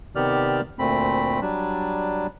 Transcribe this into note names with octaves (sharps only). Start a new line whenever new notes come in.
C3 D#3 B3 G4 D5 F6
D2 A#2 A3 C4 B5
F#3 G3 D4